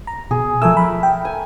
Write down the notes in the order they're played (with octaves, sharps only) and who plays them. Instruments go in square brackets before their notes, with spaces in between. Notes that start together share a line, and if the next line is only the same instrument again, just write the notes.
[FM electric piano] A#5
[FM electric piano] B2 [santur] G#4
[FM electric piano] F3 G#5 E6 [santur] A3 A#4
[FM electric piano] B5
G5
[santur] G#5